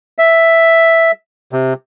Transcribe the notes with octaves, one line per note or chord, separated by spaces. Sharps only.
E5
C3